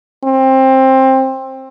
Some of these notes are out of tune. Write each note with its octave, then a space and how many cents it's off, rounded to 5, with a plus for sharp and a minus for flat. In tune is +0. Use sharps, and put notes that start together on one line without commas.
C4 +20